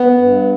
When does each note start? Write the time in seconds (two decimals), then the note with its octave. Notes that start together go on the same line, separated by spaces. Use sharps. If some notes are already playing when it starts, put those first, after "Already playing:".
Already playing: B3
0.18 G2